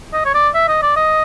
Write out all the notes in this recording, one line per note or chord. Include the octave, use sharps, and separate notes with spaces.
D#5
C#5
D5
E5
D#5
D5
D#5